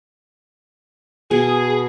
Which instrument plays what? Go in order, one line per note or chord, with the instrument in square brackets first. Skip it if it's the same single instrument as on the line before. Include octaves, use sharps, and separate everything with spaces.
[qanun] B2 [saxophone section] G#4